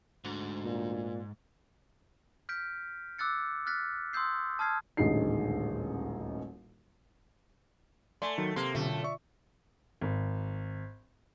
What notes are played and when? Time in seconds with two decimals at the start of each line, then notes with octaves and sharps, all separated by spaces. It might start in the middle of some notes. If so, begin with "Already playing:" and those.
0.24 D2 G#2
0.64 A#2
2.49 F6 G6 B6 D7
3.19 D6 E6 F#6 A6 C#7
3.66 F6 F#6 A6 B6
4.13 C6 D#6 E6 G6 C7
4.59 A5 D#6 F6 G#6 C7
4.97 D#1 A1 D2 G#3 D#4 C7
8.22 A3 D5 G#5 C6
8.38 D#3 F#3
8.56 C3 A#3 C6
8.75 F#2 B2 D3 A3 F4
9.03 D5 E5 C#6
10.01 G#1